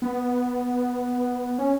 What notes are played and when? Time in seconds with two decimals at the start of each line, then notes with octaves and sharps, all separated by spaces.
0.02 B3
1.59 C#4